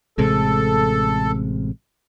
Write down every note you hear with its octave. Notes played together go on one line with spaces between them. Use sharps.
A1 C3 G#3 A4